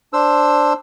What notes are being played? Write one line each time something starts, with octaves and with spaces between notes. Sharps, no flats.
D4 C5 E6